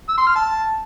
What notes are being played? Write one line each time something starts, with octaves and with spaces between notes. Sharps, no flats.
E6
C6
F6
A5